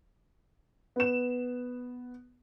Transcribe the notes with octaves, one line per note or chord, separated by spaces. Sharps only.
B3 E7